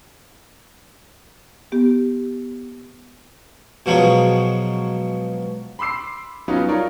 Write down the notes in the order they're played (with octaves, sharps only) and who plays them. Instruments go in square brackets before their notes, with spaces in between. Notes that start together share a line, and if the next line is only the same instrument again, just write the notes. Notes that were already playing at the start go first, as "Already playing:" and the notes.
[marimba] B3 G4
[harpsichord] B2 F3 F#3 G#3
[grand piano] B5 C6 D6 E6 C7
F#3 G3 B3 C#4 D#4 F4
D#4 F4 A#4 C#5 D5